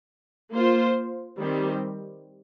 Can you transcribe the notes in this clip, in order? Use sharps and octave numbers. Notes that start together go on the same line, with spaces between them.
A#3 F4 C5
D#3 G3 C4 G4